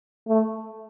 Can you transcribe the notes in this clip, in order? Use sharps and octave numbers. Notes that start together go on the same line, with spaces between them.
A3